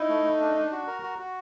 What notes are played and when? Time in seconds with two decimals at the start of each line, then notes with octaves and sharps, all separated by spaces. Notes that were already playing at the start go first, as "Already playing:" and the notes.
Already playing: D#4 E4
0.09 A3
0.24 A3
0.40 D4
0.55 D4
0.72 F#4
0.87 A#4
1.03 F#4
1.19 F#4